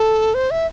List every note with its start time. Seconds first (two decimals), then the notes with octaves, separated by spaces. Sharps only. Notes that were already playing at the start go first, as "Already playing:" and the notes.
Already playing: A4
0.34 C5
0.51 E5